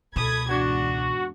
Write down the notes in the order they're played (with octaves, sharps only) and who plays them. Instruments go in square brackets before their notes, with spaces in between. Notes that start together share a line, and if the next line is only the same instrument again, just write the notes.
[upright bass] C#2 B2 [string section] A4 B5 G#6 [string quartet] D#6
[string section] E2 G#2 [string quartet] D4 [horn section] F#4